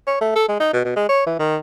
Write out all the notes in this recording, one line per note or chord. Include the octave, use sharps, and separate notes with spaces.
C#5
A3
A4
G#3
D#4
B2
B2
G#3
C#5
E3
D#3